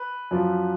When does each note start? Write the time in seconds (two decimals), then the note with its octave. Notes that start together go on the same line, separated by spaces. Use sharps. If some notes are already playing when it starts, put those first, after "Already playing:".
Already playing: B4
0.31 F#2 F3